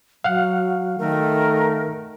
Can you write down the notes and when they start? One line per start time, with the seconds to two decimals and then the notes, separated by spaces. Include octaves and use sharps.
0.24 F#3 F5 F#5 F6
0.99 D#3 A3 A#4